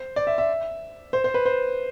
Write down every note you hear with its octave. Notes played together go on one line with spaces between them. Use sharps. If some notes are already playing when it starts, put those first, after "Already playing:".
Already playing: C5
D5
E5
E5
C5
C5
B4
C5